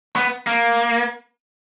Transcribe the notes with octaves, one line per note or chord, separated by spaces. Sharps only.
B3
A#3